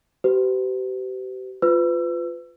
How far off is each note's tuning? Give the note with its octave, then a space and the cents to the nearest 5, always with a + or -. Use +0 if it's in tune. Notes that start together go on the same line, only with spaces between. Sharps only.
G4 -35 B4 +45
F4 +0 B4 +30 E6 +30